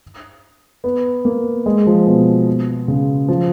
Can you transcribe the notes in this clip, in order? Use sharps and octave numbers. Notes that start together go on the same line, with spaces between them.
B3
A#3
G#3
F3
B2
C#3
F3